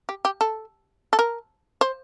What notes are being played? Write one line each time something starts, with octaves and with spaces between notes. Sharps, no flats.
G4
G4
A4
A4
A#4
C5